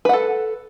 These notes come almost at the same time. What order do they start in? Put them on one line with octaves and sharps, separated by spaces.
B4 F#5 A4